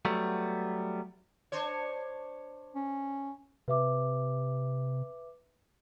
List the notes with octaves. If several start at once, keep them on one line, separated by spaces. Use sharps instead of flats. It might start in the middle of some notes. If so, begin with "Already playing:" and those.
F#3 G3 A3 B3
D4 C5 C#5
C#4
C3 B4 E5 D6